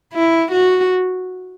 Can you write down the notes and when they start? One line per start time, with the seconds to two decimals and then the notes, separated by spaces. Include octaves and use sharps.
0.13 E4
0.52 F#4